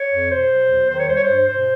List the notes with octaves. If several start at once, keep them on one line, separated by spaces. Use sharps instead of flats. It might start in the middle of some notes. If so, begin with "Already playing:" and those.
Already playing: C#5
F2
B2 C5
F#3
E2
D#3 C5
C#5
G3 C5
C#5
C5
G2
B2 C5